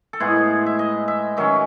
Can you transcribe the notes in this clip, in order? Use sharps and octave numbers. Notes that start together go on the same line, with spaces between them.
A4
A2 G#3 B3 E4 G#4
E5
D#5
E5
D#3 F#3 C#4 E5